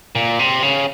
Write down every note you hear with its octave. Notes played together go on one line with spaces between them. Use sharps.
A#2
C3
C#3